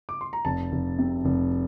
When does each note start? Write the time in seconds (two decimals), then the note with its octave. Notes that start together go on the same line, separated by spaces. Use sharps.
0.09 D6
0.21 C6
0.33 A#5
0.45 F1 A5
0.72 F1
0.99 C3
1.25 F1